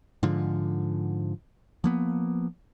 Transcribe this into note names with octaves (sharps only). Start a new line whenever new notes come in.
G#2 D3 F3
F3 A#3 B3